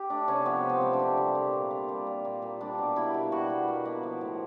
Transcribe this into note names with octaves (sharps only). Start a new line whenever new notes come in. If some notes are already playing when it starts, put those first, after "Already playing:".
Already playing: G4
A3 D4
C3 C#4
F3 B3
C3
C4
A3
D4
C3
G3
A#2
A#3
A#2
G3
A#2
A#3
A#2
G3 D4
B2
A#3 E4
B2
G3 F#4
B2
A#3
B2
F3
A2